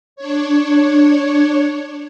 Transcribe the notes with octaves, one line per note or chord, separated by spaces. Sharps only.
D4 C#5